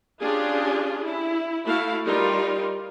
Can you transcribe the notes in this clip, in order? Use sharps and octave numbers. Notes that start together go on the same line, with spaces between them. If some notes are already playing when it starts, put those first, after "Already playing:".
C#4 D4 F4 G4 G#4
E4
A3 E4 F#4 F5
G3 D#4 F4 A#4